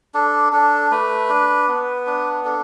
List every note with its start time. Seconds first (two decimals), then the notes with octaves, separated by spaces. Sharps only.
0.14 D4 A4
0.52 D4 A4
0.91 A3 B4
1.29 D4
1.68 B3
2.06 D4
2.45 D4 A4